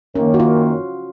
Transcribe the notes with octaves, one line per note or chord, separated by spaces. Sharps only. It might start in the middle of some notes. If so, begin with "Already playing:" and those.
F#2 D#3 A#3 C#4
F#4
F4